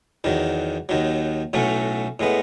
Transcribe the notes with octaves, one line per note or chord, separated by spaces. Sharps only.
E2 D#3 F#3
D#2 D#3 F#3
B1 A2 F#3 A3 C#4
A2 G#3 B3